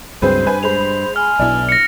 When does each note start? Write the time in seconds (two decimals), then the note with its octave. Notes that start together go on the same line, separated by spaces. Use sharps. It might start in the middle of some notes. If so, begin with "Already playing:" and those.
0.22 C#2 G2 F#3 C4 G#4 B4 C5
0.47 G2 B4 G#5
0.63 G#3 C5 B5 F7
1.16 G#5 F6
1.39 B1 B2 D4 E4
1.69 A#6 C#7